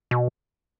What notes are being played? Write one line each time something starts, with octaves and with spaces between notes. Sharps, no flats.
B2